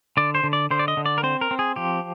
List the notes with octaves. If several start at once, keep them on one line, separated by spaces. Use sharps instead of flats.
D3 D5
C5
D3
D5
D3 C5
D5
D#5
D3
D5
A#4
C4 C5
A#4
C4
G#4
F3 G4